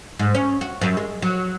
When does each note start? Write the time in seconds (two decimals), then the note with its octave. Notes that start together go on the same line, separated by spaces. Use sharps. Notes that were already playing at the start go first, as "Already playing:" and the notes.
0.19 G#2
0.35 C#4
0.61 F#4
0.81 F#2
0.97 G#3
1.22 F#3